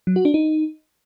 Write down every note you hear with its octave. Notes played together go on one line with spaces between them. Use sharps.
F#3
F#4
D4
D#4